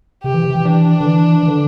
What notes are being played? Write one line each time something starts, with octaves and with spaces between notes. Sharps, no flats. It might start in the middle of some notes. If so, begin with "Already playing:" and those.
C3 G4
E3
C3
E3
E3 D4
D3
E3
E3
D3